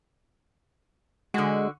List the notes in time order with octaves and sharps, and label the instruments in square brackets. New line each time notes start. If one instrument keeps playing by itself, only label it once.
[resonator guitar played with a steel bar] D3 F#4 [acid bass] G#3